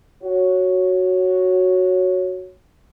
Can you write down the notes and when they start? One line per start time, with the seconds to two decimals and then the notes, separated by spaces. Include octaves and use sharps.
0.23 F#4 C#5